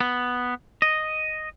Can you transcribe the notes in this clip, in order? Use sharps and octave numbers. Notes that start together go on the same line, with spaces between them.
B3
D#5